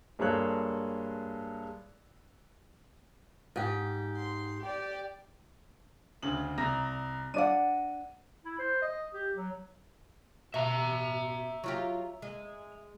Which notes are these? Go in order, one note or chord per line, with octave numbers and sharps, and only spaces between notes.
G2 G#3 A#3 A4 C#5 F#6
G#2 G4
C6
G4 D5
D2 C#3 F#7
C2 A#5 A#6
D4 D5 F#5 D#7
E4
C5
D#5
G4
F#3
B2 E5 A#5
F#3 F4 G4
G#3